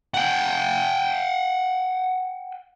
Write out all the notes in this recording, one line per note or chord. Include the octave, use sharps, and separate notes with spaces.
F#5 G5